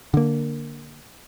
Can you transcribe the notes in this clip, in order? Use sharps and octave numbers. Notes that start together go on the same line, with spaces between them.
D3 A#3